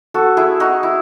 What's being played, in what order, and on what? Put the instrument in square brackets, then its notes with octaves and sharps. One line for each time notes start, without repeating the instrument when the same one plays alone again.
[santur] F#4 A4
E4 G#4
D#4 F#4
E4